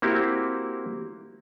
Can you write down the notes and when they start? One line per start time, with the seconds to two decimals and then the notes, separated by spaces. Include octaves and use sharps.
0.02 A#3 C4 E4 F#4 G4